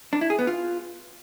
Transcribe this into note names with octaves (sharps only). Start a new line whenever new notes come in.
D4
E4
G#4
B3
F4